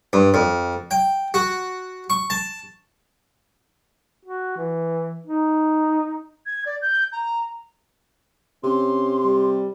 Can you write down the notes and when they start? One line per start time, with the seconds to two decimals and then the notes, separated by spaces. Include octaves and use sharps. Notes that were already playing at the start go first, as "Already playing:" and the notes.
0.13 G2
0.34 F2
0.91 G5
1.34 F#4
2.10 C#6
2.30 A5
4.25 F#4
4.57 E3
5.26 D#4
6.46 G#6
6.66 D5
6.82 G6
7.12 A#5
8.64 C3 C#4 C6
9.25 G3